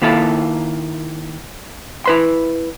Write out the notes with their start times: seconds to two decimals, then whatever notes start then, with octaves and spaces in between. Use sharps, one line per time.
0.02 D#3 A#3 E4 F4 A4
2.06 E4 B4 C6